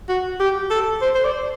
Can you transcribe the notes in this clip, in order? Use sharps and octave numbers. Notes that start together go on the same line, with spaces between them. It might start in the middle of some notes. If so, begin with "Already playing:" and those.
F#4
G4
A4
C5
C5
D5